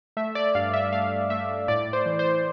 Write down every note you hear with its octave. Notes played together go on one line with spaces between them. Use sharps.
A3 E5
D5
G2 F5
E5
A3 F5
A3 E5
A2 D5
C5
E3
C5